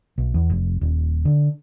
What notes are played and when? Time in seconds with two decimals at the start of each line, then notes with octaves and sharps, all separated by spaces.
0.18 B1
0.34 E2
0.50 F1
0.81 D#1
1.25 D3